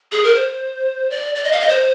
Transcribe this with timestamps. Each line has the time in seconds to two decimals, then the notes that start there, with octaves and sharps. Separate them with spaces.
0.12 G#4
0.24 A#4
0.35 C5
1.10 D5
1.35 D5
1.44 D#5
1.52 F5
1.60 D#5
1.69 C5